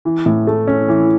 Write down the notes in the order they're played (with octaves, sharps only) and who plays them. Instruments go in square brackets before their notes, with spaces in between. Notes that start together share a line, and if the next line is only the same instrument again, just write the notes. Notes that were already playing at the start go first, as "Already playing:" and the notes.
[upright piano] E3
A2
A3
C#4
E3